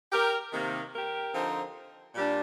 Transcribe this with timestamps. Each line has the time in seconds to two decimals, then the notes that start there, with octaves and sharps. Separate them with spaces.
0.12 G4 A#4
0.53 C3 D#3 A#3
0.94 G4 A#4
1.34 D3 F3 C4 D#4
2.15 A#2 G3 D4